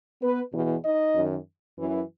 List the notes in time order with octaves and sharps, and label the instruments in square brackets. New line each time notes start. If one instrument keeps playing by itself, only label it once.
[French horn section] B3 B4
E2 B2
D#4 D#5
F#2 D#3
F#2 E3